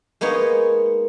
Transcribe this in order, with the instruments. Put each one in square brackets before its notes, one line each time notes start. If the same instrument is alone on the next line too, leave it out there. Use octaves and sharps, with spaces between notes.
[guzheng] G#3 A#3 B3 D#4 C#5